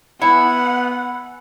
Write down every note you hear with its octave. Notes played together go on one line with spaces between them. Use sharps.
B3 E4 F#5 G#5 B5 C#7